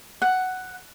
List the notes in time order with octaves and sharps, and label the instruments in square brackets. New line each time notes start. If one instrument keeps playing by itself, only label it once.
[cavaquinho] F#5